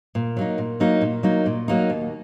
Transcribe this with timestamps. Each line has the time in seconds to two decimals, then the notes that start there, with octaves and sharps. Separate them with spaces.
0.15 A#2
0.37 F#3 A#3 D#4
0.58 A#2
0.80 F#3 A#3 D#4
1.01 A#2
1.23 F#3 A#3 D#4
1.46 A#2
1.68 F#3 A#3 D#4
1.90 D#2